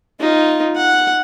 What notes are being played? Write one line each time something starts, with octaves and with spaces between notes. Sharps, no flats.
D#4 F4
F#5